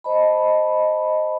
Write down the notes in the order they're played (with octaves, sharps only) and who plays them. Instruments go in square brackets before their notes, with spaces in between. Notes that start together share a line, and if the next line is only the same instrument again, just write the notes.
[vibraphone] C5 D#5 A5 B5